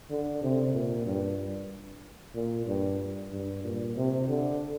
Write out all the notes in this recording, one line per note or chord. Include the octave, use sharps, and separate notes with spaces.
D3
C3
A#2
G2
A#2
G2
G2
A#2
C3
D3